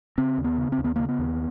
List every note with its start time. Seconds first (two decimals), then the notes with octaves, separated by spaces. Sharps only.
0.18 C#3 C4
0.38 D#2
0.44 B3
0.58 C#3
0.72 C4
0.78 D#2
0.84 B3
0.96 C#3 A#3
1.09 B3
1.19 D#2